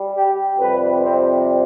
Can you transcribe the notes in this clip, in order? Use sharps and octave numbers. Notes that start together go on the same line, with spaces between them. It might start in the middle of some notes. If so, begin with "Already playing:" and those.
Already playing: G3
G4
F2 C3 G3 B4
C4